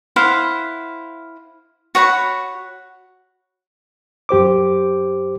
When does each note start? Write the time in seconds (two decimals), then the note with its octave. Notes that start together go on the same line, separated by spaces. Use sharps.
0.16 E4 C5 F5 F#5
1.95 F#4 C#5 F#5 B5
4.29 F#2 G4 C5 D6